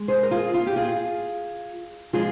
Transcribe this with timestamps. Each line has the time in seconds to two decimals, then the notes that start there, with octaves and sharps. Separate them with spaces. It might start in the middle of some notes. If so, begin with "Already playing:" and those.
Already playing: G#3
0.08 G#4 C5
0.23 A#4
0.31 F4 G#4
0.54 F4
0.67 G4
0.76 F4 G#4
2.13 F3 G#3 D4 F4 G#4